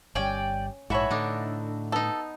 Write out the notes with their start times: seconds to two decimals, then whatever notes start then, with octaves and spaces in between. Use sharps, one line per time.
0.15 G1 G3 C#4 D5 G5 G#5
0.90 A#1 G#2 E3 A3 F#4 C#5 E5 B5
1.11 A2 D3 D4 D#4
1.92 B3 D#4 A4